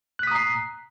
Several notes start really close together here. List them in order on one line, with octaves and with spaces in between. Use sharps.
F#6 B6 D#6 A#5 C7